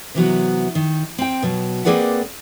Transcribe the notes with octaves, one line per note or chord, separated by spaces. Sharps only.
C3 E3 F#3 B3
D#3
C4 G5
B2 F#3
A#3 C4 G#4 B4 D5 F#5